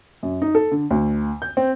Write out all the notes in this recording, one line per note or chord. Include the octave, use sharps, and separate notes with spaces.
F#2
D#4
A4
D3
D2
G6
C4